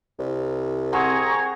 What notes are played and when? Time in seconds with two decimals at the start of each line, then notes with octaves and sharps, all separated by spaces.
0.19 C2
0.93 C4 G#4 F#5 A#5 C#6 G#6